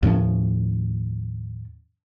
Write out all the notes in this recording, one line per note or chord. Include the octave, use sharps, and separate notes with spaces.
D#2 A2 F3 C#4